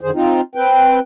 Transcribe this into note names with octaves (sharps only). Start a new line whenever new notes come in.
F#2 D3 D#3 G#4 C5
C4 D#4 F4
C4 B4 G5